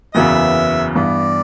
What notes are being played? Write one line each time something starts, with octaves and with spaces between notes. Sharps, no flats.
F#1 E2 C#3 F#3 B3 E5
G2 E3 B3 D5